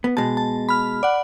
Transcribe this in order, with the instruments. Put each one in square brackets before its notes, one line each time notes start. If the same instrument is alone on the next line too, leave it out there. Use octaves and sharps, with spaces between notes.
[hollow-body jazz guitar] B3
[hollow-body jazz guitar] B2 G#3 [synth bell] A5
[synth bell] A5
B5 F6
D5 F#5